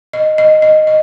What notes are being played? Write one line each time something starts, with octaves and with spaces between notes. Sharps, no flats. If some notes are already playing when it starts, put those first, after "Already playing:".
D#5
D#5
D#5
D#5